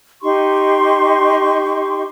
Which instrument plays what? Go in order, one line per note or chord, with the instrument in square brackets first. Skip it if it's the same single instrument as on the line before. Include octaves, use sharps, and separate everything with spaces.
[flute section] D#4 G4 C6 C#6